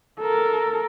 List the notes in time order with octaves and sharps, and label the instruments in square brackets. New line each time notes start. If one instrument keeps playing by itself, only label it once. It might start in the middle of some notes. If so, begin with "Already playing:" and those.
[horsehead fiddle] A4 A#4